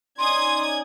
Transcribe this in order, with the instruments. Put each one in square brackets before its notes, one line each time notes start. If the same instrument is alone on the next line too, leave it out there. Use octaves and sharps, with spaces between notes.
[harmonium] C#4 D#4 D5 [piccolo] C6 [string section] D#6 G#6